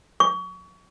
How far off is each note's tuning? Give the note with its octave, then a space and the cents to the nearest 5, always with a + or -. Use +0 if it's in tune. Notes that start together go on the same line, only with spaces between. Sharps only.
C#6 +30